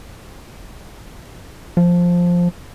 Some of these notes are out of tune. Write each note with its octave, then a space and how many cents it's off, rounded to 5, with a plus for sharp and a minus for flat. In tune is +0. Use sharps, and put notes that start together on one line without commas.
F3 +5